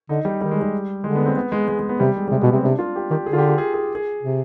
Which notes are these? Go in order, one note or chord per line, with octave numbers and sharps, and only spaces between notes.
D3 D#4
G3
D#3 G3
G#3
G3
D3 G#3
B3
C4
B3
G#3
G#3
G#3
B3
C3 G3
G#3
G3
C3 G#3
B2 B3
C3 C4
C3 D4
F4
G4
D#3 G4
D3 G#4
F4
G4
G4
G#4
G#4
G#4
C3